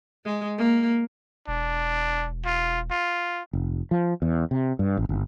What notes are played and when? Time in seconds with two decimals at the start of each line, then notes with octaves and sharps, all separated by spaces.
0.25 G#3
0.58 A#3
1.48 E1 D4
2.46 F4
2.91 F4
3.53 F1
3.91 F3
4.22 E2
4.51 C3
4.79 G2
4.97 A1
5.09 G1